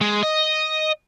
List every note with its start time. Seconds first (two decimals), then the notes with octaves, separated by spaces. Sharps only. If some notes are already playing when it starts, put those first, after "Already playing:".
0.01 G#3
0.23 D#5